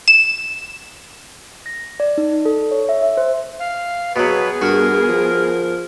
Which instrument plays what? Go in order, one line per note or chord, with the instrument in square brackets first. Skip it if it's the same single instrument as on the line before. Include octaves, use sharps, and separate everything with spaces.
[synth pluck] E7
[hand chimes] A#6
D5
D#4
A4
C#5
E5
E5
C5
[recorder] F5
[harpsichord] B2 F#3 [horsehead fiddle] B3 G#4 [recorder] B4
[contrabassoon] G2 [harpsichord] F#4 D#6 [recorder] A#4
[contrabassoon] F3